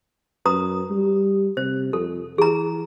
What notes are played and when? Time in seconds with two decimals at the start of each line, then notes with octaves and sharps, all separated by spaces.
0.45 F#2 B4 A#5 D#6
0.91 G3
1.57 C3 C5
1.93 F2 A4
2.38 E3 G#4 A#5